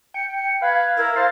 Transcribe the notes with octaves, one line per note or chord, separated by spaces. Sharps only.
G5 C#7
B4 F5 G#6
E4 A#4
C5 F5 A6